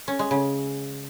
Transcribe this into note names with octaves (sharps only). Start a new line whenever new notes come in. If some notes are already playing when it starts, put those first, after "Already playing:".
C#4
G#3
C#3